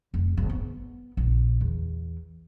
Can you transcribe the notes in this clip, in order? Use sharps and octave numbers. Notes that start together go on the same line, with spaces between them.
F1
G#1
B3
A#1
E2